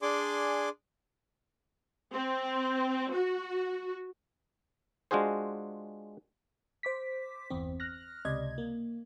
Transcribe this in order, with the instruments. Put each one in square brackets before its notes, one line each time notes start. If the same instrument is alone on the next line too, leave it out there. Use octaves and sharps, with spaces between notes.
[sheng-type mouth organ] D4 G#4 D5 G#5 C6 D6
[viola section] C4
F#4
[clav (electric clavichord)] G#3 D4 F4 F#4 G#4 C5
[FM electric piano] C5 D6 B6
G1 E2 C4
F6 F#6 A#6
C#2 C3 D5 D#5 G#6
A#3